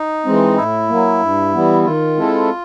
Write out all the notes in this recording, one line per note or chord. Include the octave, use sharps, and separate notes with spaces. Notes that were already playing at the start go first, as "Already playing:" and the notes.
Already playing: D#4
E3 G#3 C4
A2 E4
F#3 A#3
G2
E3 G3 B3
D#3 F4
G#3 C4 E4 A4